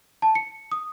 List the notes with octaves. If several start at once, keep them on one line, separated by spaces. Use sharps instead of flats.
A5
C#7
D#6